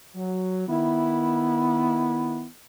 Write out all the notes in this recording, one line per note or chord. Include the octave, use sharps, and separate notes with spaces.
F#3
D#3 B3 E4